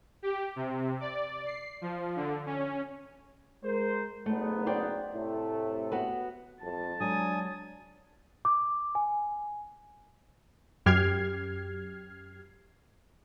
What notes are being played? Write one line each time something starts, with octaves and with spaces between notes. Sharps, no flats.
G4
C3
D5
C7
F3
D3
C#4
G#3 A#4 C5
F#1 G#2 A3 B3
C5 D5 G5
A2 C3 A3
B3 F#4 B4
F2 A5
F#3 G#3 D4 G#5 D#6
D6
G#5
F#2 G4 F6 G#6 C7